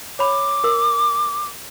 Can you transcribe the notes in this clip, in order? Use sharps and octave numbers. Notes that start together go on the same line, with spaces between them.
C#5 B5 D6
A#4 E6